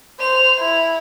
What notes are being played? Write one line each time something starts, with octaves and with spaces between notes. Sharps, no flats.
C5 F7
E4